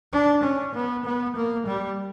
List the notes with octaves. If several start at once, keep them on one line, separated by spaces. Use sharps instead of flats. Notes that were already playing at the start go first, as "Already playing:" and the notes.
D4
C#4
B3
B3
A#3
G3